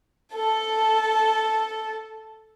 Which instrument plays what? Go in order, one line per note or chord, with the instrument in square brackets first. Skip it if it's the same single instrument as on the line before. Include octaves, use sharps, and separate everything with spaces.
[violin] A4 A5